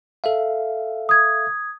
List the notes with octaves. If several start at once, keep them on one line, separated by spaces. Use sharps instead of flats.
A4 E5 F5
D#6 G#6